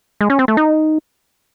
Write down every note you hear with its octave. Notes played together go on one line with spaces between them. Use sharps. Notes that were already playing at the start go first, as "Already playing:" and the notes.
G#3
C#4
C4
A3
D#4